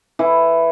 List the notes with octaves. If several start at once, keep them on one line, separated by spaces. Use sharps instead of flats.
E3